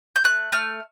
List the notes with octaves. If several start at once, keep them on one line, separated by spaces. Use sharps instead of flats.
G6
A3 F#6
A3 F6